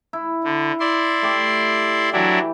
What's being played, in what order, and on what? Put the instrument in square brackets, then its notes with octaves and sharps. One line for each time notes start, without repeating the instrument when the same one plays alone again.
[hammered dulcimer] E4
[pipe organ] D3
E4 D5 C6
[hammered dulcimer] A3 G4
[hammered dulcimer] E3 G4 [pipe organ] F#3 D4 E4